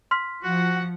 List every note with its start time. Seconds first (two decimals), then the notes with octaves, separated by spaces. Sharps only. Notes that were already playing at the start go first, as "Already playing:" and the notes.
0.11 C6 F6 B6
0.43 F3 F#4 F#5